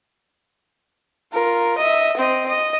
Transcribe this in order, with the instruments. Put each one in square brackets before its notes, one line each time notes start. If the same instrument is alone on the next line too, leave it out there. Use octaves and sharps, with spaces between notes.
[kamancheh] F4 A#4
D#5 E5
C4 D#5
D#5